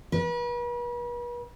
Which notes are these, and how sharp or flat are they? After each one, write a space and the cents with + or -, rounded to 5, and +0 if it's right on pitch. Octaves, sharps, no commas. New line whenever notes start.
B4 -40